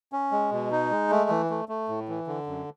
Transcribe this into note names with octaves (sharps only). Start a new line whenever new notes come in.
C#4
G#3
B2
D#4
G#3
A3
E3
A3
A3
A2
E3
D3
F#2